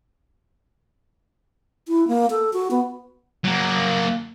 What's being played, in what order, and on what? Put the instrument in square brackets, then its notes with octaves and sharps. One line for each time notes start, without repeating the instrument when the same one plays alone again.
[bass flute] E4
A#3
A4
F#4
B3
[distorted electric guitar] F#3 A#3